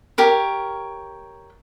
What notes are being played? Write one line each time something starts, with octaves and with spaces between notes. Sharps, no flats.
G4 A#4 C#5